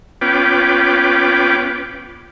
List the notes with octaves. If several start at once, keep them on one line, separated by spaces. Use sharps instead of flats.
B3 C#4 F4 B4 G5 D6